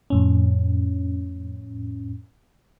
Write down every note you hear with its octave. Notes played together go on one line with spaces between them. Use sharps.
F2 A2 C#4